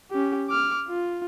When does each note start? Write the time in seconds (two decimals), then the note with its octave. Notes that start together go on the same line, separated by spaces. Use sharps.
0.11 C#4 G4
0.49 D6 F6
0.89 F4